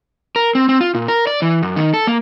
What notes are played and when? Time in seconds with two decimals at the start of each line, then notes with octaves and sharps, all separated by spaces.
0.36 A#4
0.55 C4
0.69 C4
0.81 F4
0.94 A#2
1.08 A#4
1.27 D5
1.42 E3
1.63 F#2
1.76 D#3
1.94 A4
2.07 A#3